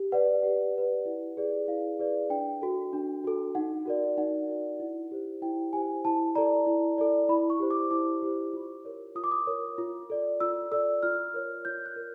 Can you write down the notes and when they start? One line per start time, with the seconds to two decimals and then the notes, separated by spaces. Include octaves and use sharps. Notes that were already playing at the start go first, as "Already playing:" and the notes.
Already playing: G4
0.12 B4 D5 F#5
0.43 G4
0.75 B4 D5
1.05 E4
1.37 G#4 B4 D5
1.68 E4 F5
1.99 G#4 B4 D5
2.30 D4 G5
2.62 F#4 A4
2.93 D4
3.24 F#4 A4
3.55 D#4 F#5
3.86 F#4 A#4 D5
4.18 D#4 F#5
4.49 F#4 A#4 D5
4.80 E4
5.11 G4 C5
5.42 E4 G5
5.73 G4 C5 G#5
6.05 E4 A5
6.35 A4 D5 A#5
6.67 E4
6.98 A4 D5
7.29 E4 B5
7.50 C#6
7.59 G4 C5
7.70 D6
7.91 E4 D6
8.22 G4 C5
8.53 F4
8.85 A#4 C#5
9.16 F4 D#6
9.24 D6
9.31 D#6
9.47 A#4 C#5
9.78 F4
10.10 A4 D5
10.40 F4 E6
10.72 A4 D5 E6
11.03 F4 F6
11.34 A#4 C#5
11.65 F4 G6
11.86 F#6
11.96 A#4